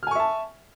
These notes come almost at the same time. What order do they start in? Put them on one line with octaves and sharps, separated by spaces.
F6 G#5 C#6 E5 A5